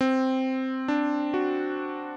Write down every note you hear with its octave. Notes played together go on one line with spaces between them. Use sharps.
C4
D4
F#4